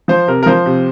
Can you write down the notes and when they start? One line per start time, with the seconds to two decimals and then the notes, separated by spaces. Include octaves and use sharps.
0.08 F3 C5
0.28 C3 A#4
0.43 A#4
0.46 F3 C5
0.66 C3